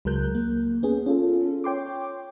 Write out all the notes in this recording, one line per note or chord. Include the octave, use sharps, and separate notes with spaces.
C#2 F#3 G#3 A#4 F#6 G6
A#3
B3 C#4 G#4
C#4 F4 A4
C#5 G5 C6 D6